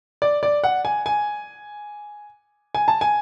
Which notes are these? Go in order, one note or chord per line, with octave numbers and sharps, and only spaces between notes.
D5
D5
F#5
G#5
G#5
G#5
A5
G#5